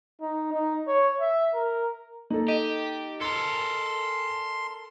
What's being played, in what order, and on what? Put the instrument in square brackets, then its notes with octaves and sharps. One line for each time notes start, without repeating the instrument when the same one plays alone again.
[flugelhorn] D#4
D#4
C#5
E5
A#4
[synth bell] A#3 [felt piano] D#4 A4
[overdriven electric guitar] G4 [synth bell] D#5
[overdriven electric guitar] A4 A#4 [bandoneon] C6 [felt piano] C#7